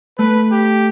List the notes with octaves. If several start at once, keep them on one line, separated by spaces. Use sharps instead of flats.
A3 B4
G4